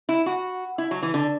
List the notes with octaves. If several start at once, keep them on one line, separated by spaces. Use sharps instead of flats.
E4
F#4
E4
F#3
E3
D3